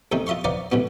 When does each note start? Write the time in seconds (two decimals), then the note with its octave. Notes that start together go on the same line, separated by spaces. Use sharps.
0.12 E2 C3 D#3 A3 D#4
0.27 F4 D#5 E5 C6 C#6
0.44 D#4 B4 C5 D5 F5 F#5
0.72 A1 G#2 B2 B3